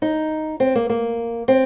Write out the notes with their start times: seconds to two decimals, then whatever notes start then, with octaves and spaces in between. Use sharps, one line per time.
0.02 D#4
0.60 C4
0.75 A#3
0.89 A#3
1.48 C4